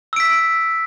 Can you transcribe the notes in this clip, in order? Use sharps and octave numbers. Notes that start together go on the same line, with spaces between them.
E6 B6 D7